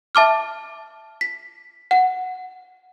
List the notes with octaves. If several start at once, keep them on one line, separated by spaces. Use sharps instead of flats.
E5 A5 D6 F6
B6
F#5